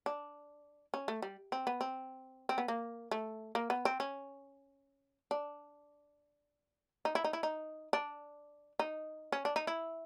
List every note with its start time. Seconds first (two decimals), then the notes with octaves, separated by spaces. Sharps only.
0.06 D4
0.94 C#4
1.08 A3
1.22 G3
1.52 C4
1.67 B3
1.81 C4
2.49 C4
2.58 B3
2.68 A#3
3.11 A3
3.55 A#3
3.70 B3
3.85 C4
4.00 C#4
5.31 D4
7.05 D#4
7.15 E4
7.24 D#4
7.33 E4
7.43 D#4
7.93 D4
8.79 D#4
9.32 C#4
9.45 D4
9.56 D#4
9.67 E4